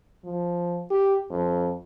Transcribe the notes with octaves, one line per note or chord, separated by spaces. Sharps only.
F3
G4
F2